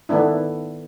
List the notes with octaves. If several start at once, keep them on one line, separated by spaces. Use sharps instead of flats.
D#3 A3 B3 D4 E4